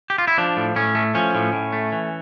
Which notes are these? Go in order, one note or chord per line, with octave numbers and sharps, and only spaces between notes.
G4
F4
E4
F3 D4
A2
A2 C#4
A3
F3 C#4
A2
A2
A3
E3